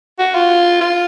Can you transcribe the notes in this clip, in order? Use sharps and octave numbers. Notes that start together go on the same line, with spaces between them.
F#4
F4
F4